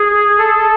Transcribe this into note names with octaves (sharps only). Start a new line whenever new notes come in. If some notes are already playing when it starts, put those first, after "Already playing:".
Already playing: G#4
A4